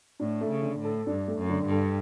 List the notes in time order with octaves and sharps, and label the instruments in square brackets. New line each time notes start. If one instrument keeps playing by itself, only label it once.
[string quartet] A2 [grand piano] D4
[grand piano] A3
[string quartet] C#3
[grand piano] D3
[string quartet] A2
[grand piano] A4
[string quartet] G2 [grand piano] D4
[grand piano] A3
[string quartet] F#2
[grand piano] D3
[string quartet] G2
[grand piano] A4